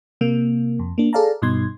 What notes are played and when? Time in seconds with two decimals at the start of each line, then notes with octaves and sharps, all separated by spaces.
0.21 C3 A#3
0.79 F2
0.98 A#3 D4
1.13 G#4 A4 D5 F5 A5 A#5
1.42 G2 B2 D#4 C6 G#6